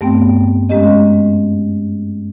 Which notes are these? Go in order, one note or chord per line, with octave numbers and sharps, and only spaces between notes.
G2 A3 B3 C4 G5
F#2 G#3 C#4 G4 D#5